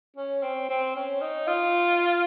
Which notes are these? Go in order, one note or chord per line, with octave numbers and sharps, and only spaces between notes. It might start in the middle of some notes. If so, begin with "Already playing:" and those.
C#4
C4
C4
C#4
D#4
F4